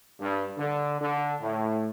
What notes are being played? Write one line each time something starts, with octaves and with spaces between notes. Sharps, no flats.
G2
D3
D3
A2